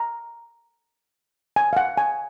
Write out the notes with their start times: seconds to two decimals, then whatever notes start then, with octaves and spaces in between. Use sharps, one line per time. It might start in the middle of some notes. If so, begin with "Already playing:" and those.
Already playing: A#5
1.56 G#5
1.73 F5
1.77 F#5
1.97 G#5